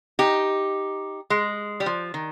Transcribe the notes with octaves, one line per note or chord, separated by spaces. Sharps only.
D#4 G4
G#3
G3
F3
D#3